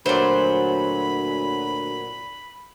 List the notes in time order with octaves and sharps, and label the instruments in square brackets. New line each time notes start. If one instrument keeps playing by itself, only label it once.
[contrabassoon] D2 [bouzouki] A#2 F#3 [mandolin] C5 [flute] B5